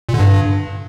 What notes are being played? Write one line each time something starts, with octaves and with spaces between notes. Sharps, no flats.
A#2
D3
G2